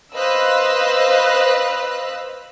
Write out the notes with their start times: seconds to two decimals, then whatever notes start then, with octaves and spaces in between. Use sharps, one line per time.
0.15 B4 C5 D#5 F5 E6 F#6